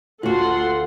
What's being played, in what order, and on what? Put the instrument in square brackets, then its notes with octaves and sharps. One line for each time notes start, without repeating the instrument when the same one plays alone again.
[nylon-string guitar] D2 F#4 [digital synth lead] F4 [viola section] A4 F#5 C6